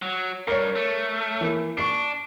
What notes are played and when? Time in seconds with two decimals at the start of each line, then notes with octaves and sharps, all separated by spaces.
0.02 F#3
0.48 G2 A#4 C#5
0.76 A3
1.41 E3 A#3
1.77 D4 C#6 C7